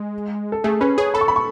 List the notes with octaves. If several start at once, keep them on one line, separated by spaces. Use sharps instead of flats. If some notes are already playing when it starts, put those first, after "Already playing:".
Already playing: G#3
A4
A3 G#4
C#4 B4
G#4 C#5
A4 B5
C#6
B5
C#6